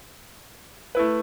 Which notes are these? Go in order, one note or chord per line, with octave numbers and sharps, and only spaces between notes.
A3 E4 B4